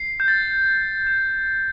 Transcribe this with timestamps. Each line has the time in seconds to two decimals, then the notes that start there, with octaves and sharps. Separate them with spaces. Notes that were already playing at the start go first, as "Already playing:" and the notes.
Already playing: C7
0.20 G6
0.28 A6
1.07 G6